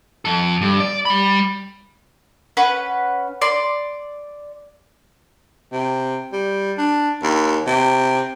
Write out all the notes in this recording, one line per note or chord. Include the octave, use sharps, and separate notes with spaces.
F2 A4
G2
D5
G3 B5
C#4 B4 F#5
D5 C6
C3
G3
D4
D#2
C3